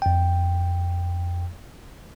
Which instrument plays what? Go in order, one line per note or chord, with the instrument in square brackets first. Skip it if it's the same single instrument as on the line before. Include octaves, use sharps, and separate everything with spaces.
[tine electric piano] F2 G5